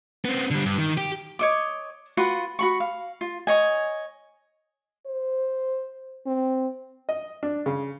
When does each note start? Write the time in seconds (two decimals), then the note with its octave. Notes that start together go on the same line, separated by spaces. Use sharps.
0.25 B3 C4
0.51 D3 G3
0.65 G2
0.78 D#3
0.97 G4
1.39 C#5 D#5 D6
2.17 F4 F#4 B4 F#5
2.59 F#4 B5 C#6
2.80 F5
3.21 F4
3.47 C#5 D#5 G#5
5.07 C5
6.26 C4
7.09 D#5
7.43 D4
7.66 C#3